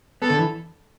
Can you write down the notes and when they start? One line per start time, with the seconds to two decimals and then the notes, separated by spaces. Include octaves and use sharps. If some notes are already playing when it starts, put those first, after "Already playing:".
0.22 B3 A4
0.30 D3
0.39 E3